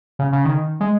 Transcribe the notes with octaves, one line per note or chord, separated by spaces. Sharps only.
C#3
C#3
D#3
G#3